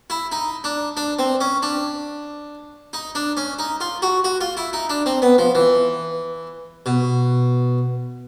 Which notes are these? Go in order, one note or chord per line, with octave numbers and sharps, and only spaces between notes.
E4
D#4
D4
D4
C4
C#4
D4
D#4
D4
C#4
D#4
F4
F#4
F#4
F4
E4
D#4
D4
C4
B3
F3
E3
B2